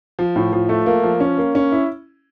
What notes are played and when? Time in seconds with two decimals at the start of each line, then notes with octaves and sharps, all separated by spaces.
0.19 F3
0.36 A2
0.53 F3
0.69 A3
0.86 A#3
1.04 F3
1.20 C#4
1.38 A#3
1.55 C#4
1.72 E4